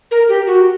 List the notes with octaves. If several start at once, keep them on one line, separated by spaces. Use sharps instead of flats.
A#4
G4
F#4